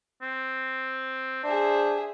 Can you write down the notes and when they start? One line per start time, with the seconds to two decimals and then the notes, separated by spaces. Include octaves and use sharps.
0.22 C4
1.44 D4 G#4 C5 E5